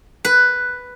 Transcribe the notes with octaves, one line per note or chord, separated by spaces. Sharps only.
B4